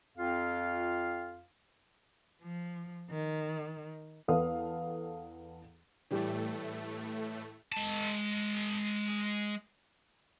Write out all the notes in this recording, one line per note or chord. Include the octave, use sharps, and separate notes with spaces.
F2 F4 F5
F3
D#3
E2 B3 A4 F5 D#6
A2 E3 G3 A3 G4
G#3 A5